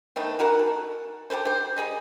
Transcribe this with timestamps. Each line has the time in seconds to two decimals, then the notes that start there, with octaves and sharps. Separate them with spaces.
0.16 D#3 A3 B3 C4
0.39 E3 F#4 A#4 F#5
0.59 A4
1.30 G4 A4 B4 C5
1.45 G4 C5
1.77 G3 A#3 G#4 D#5